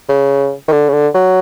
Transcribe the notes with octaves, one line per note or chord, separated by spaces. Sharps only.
C#3
D#3
D3
C#3
D3
F#3